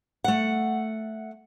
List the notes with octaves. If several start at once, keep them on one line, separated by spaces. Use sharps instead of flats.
A3 F#5